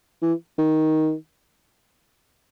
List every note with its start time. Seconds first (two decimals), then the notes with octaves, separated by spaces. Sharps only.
0.22 E3
0.58 D#3